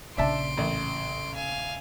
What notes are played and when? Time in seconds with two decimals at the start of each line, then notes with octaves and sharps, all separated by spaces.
0.17 A#1 C#3 D4 E5 A5 C6 D7
0.57 A1
1.35 F5 G#5